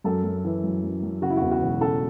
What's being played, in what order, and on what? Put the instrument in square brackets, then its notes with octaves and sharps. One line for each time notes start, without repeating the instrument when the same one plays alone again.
[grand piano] F#2 A4
F#2
E3
F#2
F#2
F#2
C#3 F#4
E4
F#4
E2
F#4
E1
C#3 A4